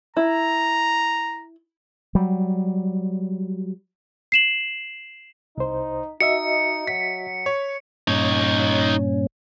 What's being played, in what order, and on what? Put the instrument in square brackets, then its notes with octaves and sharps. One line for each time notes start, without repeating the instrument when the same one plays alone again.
[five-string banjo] E4 [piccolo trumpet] A#5
[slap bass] F#3 G3
[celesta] C7 E7 F#7
[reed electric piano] C2 C5 [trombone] D#4
[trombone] D#4 [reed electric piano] F#4 D#5 E5 [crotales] C#7
[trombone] F#3 [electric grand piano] B6
[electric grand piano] C#5
[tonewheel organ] G2 A#2 C#4 [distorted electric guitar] D#4 C#5